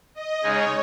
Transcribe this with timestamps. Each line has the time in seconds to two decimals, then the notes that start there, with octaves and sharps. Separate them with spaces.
0.14 D#5
0.43 C#3 G#3 D#4 G#4 C#5